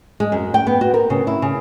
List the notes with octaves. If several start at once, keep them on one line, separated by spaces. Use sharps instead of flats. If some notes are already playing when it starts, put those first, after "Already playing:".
G#3
F#2
G5
B3
F#4
A#4
C#3
E4
C#3